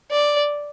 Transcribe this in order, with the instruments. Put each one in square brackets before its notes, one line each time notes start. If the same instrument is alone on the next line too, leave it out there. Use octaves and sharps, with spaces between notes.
[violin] D5